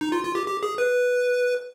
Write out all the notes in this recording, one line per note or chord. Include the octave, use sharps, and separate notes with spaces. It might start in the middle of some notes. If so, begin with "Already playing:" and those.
D#4
F4
F4
G4
G4
G#4
B4